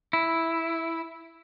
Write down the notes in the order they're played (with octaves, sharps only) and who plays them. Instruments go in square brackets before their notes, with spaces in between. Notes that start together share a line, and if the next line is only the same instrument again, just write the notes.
[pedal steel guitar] E4